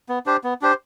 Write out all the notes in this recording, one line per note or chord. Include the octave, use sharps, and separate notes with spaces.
B3
D4 G4 C5
B3
D4 G4 C5